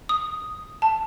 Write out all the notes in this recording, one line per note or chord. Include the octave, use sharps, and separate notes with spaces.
D#6
A5